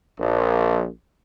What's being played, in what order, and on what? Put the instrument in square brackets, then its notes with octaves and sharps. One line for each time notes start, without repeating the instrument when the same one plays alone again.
[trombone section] A#1